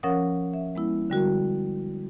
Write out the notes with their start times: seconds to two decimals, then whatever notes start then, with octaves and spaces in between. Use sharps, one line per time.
0.03 F3 C#4 A#4 C#5 F#5 D#6
0.54 E5
0.75 G#3 B3 E4
1.10 D3 G3 F#4 A#4